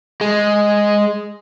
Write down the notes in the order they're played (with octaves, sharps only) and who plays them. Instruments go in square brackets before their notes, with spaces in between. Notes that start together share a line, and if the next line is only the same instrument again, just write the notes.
[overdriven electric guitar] G#3